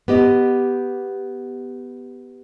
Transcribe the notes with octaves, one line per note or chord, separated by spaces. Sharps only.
B3 G4 D#5